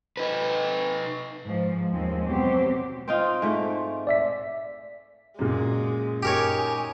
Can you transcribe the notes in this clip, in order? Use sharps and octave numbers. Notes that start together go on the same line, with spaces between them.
D#4 B4
G#2 F3
D#2 F3 G#3 C4
F#2 B2 F#3 C4 G4 C5
C4 D#4 F4
G#2 A3
D5 E5 B6
F#2 A#2 G#3
D#4 G4 A#4 C#5 G#5